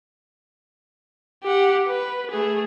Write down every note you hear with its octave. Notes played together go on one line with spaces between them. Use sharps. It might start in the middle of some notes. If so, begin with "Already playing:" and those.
G4 F#5
B4
A3 G#4